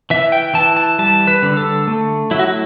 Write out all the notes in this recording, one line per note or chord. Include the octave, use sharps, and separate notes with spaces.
E3 E5
G5
E3 A5
A5
G3 A5
B4
D3
A4
A3
F#3 E4
F#4
E4